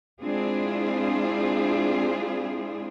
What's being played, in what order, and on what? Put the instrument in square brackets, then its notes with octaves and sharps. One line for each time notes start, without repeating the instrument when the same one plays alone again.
[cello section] G#3 C4 D4 E4 F4 G#4